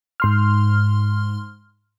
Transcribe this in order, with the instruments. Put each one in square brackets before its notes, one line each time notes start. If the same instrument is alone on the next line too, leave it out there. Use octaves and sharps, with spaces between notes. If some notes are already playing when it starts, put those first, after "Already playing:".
[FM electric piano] G#2 C6 F6